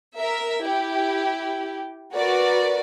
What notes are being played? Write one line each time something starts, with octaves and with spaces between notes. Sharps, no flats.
A#4 E5
E4 G4
F#4 A#4 B4 D5